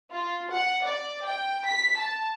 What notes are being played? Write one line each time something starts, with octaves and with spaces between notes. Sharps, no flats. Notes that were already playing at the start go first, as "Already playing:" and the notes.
F4
F#5
D5
G5
B6
A5